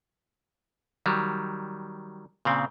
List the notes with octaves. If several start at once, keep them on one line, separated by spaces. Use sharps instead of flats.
D#3 F#3 G3
A#2 C#3 C4